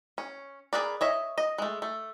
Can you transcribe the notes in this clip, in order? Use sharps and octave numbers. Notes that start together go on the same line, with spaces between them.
C#4
G#4 A#4 B4 D5
C#5 D#5 E5
D#5
G#3 A3
A3